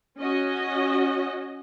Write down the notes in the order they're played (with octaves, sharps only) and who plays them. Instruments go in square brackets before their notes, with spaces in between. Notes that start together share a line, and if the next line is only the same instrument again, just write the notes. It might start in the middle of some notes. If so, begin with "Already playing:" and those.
[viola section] C#4 F#4 D#5